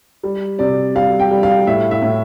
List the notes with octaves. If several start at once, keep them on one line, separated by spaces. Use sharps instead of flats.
G3
C3 D5
G3 F5
G5
G3
F5
A2 E5
E5
A2